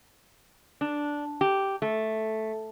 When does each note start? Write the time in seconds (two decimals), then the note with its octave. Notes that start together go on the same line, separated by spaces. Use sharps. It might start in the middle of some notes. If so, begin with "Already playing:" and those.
0.81 D4
1.41 G4
1.82 A3